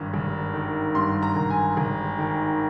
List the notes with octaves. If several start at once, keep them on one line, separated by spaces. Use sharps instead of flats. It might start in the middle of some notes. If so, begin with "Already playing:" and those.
Already playing: G#1 G2
G#1
D#3
G2 C6
A#5
G#1
G#5
G#1
D#3